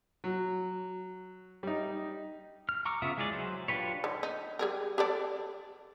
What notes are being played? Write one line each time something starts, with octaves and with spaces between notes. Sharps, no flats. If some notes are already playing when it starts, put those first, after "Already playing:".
F#3
G3 D#4
F6
A#5 C#6 D6 E6 F6
C#3 B3 F4 E5 D#6
G#3 E4 G#4 C#5 D5
F#3 C5
D4 F4 G4 B4 C#5
D3 D#3
D#4
G3 G#4 A#4
G4 A4 D5